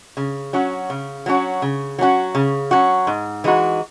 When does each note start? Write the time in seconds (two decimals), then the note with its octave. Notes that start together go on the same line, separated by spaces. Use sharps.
0.17 C#3
0.53 F#3 C#4 F#4
0.90 C#3
1.26 F#3 C#4 F#4
1.62 C#3
1.99 F#3 C#4 F#4
2.35 C#3
2.71 F#3 C#4 F#4
3.07 G#2
3.44 E3 G#3 D#4 F#4